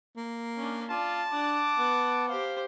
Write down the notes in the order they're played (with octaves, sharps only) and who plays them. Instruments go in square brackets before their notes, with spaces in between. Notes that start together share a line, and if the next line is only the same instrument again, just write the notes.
[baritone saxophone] A#3
[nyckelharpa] C#4 D4
[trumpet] F4 [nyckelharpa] D5 [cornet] A5
[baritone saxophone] D4 [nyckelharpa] F#5 [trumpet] D6
[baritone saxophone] B3
[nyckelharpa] G4 C5 [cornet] F5